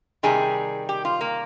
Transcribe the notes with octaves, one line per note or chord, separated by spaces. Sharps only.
C3 D#3 G3 G#4
G4
F4
A#3